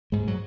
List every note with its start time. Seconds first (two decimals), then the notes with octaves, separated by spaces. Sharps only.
0.12 G#2 G#3
0.27 F#3